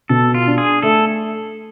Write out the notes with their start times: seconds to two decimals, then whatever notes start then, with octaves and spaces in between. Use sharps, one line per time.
0.09 B2 A4
0.34 F4
0.47 D4
0.58 G#4
0.82 A3 A4